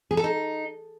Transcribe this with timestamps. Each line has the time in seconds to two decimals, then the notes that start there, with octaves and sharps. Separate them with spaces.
0.11 G#4
0.17 A4
0.24 D#4